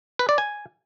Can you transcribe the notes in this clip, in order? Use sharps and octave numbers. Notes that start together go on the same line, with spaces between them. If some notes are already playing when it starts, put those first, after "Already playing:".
B4
D5
G#5